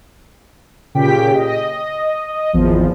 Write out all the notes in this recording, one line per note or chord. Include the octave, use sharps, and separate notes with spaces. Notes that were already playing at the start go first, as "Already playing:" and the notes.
A#2 C#3 G4 G5 B6
D#5
G#1 E2 F3